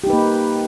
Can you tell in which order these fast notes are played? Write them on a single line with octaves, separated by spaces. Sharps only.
G4 D#4 B4 A#3